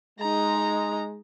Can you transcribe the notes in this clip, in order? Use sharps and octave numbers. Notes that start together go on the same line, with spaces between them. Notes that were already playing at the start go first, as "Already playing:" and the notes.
G#3 D#4 A#5